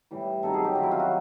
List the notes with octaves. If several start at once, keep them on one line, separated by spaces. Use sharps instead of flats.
A2 E3 G3
C3 D#3 F#3 A4
G#4
G4
C3 D#3 F#3 F4
E4
F4
F#4